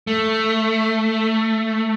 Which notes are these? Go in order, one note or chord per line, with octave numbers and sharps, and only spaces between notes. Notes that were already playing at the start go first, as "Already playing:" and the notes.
A3